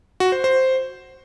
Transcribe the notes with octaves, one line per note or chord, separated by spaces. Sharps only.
F#4
C5
C5